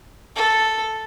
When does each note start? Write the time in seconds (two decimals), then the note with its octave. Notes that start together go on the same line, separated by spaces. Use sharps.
0.36 A4